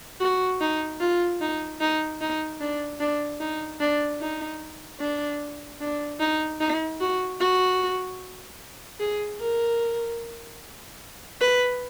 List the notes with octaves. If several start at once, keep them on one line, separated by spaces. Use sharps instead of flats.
F#4
D#4
F4
D#4
D#4
D#4
D4
D4
D#4
D4
D#4
D4
D4
D#4
D#4
F#4
F#4
G#4
A#4
B4